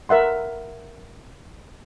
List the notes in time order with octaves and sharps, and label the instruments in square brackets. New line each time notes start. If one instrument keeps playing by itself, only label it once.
[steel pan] A#4 E5 F#5 C6